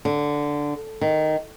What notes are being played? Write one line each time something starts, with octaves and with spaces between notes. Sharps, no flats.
D3
D#3